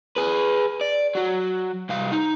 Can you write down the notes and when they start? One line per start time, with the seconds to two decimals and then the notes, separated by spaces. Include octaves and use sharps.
0.16 G#4 B4
0.81 D5
1.15 F#3 F#4
1.89 C2 F5
2.12 D#4